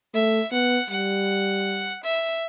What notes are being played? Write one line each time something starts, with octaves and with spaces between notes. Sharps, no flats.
A3 E5
B3 F#5
G3 F#5
E5